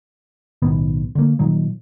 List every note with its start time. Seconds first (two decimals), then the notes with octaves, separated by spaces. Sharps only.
0.62 B1 A2 D#3 B3
1.15 D3 A#3
1.39 A#2 D#3 F#3